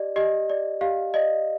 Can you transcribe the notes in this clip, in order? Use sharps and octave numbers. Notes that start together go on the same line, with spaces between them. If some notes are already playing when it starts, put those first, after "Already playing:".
Already playing: G4 D5 D#5
G4 D#5
D5
G4 F5
D5 D#5